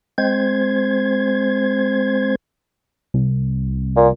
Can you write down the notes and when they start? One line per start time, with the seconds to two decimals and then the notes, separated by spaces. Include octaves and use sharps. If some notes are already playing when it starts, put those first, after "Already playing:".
0.18 G#3 C4 C5 G#6
3.14 C2
3.96 A#2